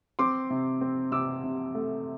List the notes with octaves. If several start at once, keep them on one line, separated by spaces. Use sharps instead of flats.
C4 C6 D6
C3
C4
C3 D6 E6
C3
A3